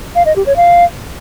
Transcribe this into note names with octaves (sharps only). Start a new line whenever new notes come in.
F5
D#5
G4
C#5
F5